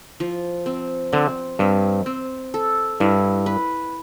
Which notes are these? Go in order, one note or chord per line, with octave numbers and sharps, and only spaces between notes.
F3
C4
D3 C4
G2 C4
C4
A4
G2 E4
B4